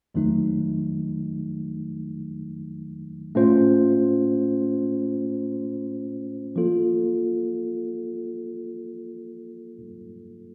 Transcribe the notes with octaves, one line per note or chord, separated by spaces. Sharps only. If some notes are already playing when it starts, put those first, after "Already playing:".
F2 D#3 F#3 A3 D#4
A2 A3 C#4 F4 C5
F3 A#3 F4 A4